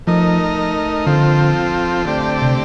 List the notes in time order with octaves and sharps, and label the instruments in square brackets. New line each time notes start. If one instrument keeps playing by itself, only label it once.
[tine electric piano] F3 [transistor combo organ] A3 D#4 A#4 D#5
[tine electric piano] D3 [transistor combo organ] F3 C4 F4 A4
[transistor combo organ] D3 A3 C4 G4 D5
[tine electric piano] C3